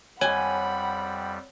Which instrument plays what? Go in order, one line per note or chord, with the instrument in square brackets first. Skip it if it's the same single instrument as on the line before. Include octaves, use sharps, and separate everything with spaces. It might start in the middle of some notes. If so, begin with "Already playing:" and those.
[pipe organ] F2 G3 [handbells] C#5 [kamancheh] F#5 B5 [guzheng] G#5